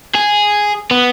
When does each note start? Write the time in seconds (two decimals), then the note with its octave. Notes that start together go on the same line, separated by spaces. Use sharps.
0.15 G#4
0.91 B3